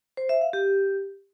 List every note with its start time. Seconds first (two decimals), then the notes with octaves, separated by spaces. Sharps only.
0.17 C5
0.29 E5
0.41 F5
0.53 G4